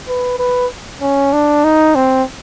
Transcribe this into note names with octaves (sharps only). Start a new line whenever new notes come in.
B4
B4
C#4
D4
D#4
C4